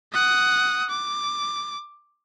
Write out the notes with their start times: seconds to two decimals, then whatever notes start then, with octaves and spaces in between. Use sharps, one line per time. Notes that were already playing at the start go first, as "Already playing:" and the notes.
0.13 F#5 D#6
0.90 D6